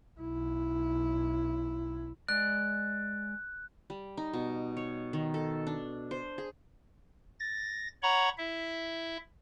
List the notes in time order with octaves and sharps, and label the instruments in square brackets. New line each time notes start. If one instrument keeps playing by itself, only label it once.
[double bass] B1 E4
[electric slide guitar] G#3 D5 [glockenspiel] F#6
[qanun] G3
D#4
B2
C#5
D#3
A4
D4
C5
G#4
[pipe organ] A6 A#6
C#5 F#5 A#5 B5 C#6
E4 E5